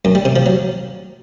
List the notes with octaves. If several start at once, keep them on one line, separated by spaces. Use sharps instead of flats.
F#2
G3
C3
F3
F#3